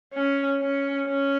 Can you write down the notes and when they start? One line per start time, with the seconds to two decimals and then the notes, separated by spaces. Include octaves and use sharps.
0.14 C#4
0.61 C#4
1.07 C#4